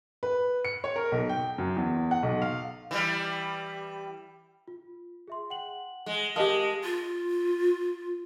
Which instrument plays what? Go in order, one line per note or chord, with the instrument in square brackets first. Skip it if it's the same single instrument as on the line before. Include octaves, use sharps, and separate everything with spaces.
[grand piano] B4
C#7
C#5
A#4
B1
G5
F#2
E2
F#5
B1
F5
[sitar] E3 G3
[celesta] F4
G#4 E5 C6
F#5 G5 F#7
[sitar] G#3
[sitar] G#3 [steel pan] G4 D#5 F5 [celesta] A#4 A5 D#6
[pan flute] F4